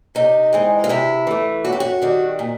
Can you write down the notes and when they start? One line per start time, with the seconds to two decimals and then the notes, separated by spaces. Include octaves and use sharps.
0.15 C3 D#4
0.53 E3 G#3 C4
0.84 F4
0.89 C3 E4
1.27 E3 A3
1.64 F#2 F#4
1.73 G4
1.80 F#4
2.02 D#3 G3 C4
2.39 A#2